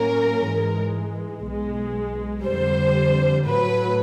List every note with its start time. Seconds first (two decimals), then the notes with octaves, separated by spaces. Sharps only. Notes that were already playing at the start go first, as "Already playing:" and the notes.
Already playing: A2 F#3 A#3 C#4 A#4
0.44 G#2 E3 G#3
1.45 B1 B2 G#3
2.46 F2 D3 G3 C5
3.46 A2 F#3 A3 B4